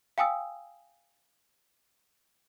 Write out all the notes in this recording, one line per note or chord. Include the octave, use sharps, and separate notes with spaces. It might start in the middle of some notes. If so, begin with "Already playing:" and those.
F5 G5 G#5 D#6 E6